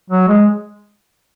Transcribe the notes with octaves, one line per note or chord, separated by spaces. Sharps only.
F#3
G#3